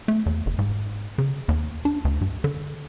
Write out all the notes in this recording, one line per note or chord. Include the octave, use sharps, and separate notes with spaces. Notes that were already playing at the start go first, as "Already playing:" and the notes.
A3
E2
F#1
G#2
C#3
D#2
D4
D2
G2
D3